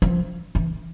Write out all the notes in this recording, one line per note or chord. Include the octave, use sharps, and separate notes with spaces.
F3
E3